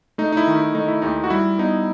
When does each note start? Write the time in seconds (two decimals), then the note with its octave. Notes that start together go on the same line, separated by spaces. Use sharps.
0.18 A3 D#4
0.32 D#4
0.37 E4
0.47 D#3
0.56 E4
0.74 A3 D#4
0.88 E4
1.02 D#2 D#4
1.24 F#4
1.30 G3 E4
1.58 B3 D#4